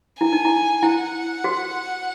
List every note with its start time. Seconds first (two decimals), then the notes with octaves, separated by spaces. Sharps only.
0.21 E4 G#5
0.33 D#4
0.45 E4
0.83 E4 F#5
1.44 F#4